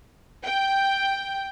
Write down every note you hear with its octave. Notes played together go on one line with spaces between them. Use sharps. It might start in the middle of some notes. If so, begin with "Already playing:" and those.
G5